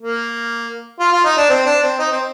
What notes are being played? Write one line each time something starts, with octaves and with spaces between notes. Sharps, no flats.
A#3
F4
F4
D#4
D4
C4
D4
C4
D#4
C4